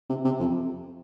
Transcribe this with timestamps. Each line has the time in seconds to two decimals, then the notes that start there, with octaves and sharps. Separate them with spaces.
0.09 C3
0.24 C3
0.40 F2